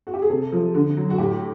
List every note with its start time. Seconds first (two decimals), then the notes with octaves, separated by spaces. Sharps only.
0.07 F#4
0.14 G4
0.22 G#4
0.30 C3 A4
0.52 F3
0.75 D3
0.97 F#3
1.10 F#4
1.18 A2 G4